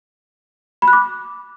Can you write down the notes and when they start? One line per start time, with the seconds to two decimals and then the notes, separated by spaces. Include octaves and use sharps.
0.82 B5
0.88 F#6
0.93 D6